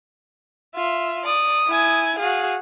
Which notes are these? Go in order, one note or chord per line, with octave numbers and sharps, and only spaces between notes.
F4 E5
D5 D#6
E4 G#5
F#4 G#4 F5